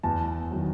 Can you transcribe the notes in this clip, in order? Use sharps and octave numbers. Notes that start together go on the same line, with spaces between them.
E2 A5
D#3 F#3